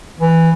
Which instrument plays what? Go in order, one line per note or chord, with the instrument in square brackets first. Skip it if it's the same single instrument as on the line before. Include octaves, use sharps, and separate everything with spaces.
[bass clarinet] E3